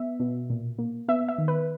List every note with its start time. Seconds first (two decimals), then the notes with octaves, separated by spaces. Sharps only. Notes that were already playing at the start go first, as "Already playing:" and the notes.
Already playing: B3 E5
0.20 B2
0.50 A#2
0.79 A#3
1.08 B3 E5
1.29 E5
1.38 D#3
1.48 B4